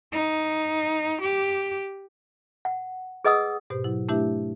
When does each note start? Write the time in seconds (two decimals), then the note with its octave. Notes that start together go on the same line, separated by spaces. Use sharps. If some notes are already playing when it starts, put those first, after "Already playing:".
0.12 D#4
1.21 G4
2.65 F#5
3.25 G#4 B4 D#5 F#5 D#6 E6
3.70 G#2 B2 G4 C5
3.84 F#3 E4
4.09 A3 D4 E4 G4 B4 E5